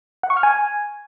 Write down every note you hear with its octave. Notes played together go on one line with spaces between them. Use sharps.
F#5
C#6
F6
G#5